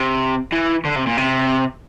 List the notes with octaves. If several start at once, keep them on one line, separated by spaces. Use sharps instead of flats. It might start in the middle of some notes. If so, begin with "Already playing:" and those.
Already playing: C3
E3
D3
C3
A#2
C3